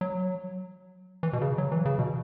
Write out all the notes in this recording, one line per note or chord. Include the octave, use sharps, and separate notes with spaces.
F#3
E3
B2
C#3
F#3
E3
C#3
B2